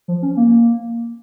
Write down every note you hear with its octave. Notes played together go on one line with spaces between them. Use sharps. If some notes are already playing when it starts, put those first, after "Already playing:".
F3
C#4
A#3